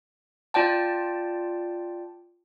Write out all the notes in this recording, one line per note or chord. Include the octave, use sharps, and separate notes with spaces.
F4 D5 G5 A5